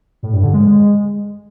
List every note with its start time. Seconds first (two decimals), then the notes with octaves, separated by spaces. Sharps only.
0.23 A2
0.33 G2
0.43 D3
0.54 G#3